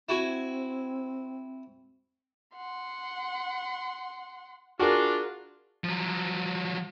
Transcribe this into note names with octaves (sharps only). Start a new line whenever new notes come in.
C4 E4 F#4 G#5
F#5 C6
D4 F4 F#4 G#4 A#4
F3 F#3